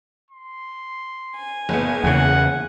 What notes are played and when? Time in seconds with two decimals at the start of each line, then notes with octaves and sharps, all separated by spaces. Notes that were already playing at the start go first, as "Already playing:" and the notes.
0.31 C6
1.36 G#5
1.69 F#1 B3
2.04 E2 C#3 F#5